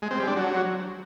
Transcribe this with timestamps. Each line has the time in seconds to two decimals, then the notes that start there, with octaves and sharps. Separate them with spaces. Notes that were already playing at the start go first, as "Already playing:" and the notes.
0.02 G#3
0.11 C4
0.19 G3
0.28 D4
0.36 F#3